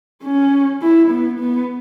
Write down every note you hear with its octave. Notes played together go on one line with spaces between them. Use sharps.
C#4
E4
B3
B3